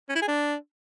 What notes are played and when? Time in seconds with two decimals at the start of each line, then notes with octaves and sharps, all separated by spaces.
0.09 C#4
0.15 E4
0.22 G#4
0.28 D4